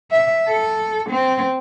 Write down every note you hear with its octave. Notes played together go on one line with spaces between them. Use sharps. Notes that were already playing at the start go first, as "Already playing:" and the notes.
E5
A4
C4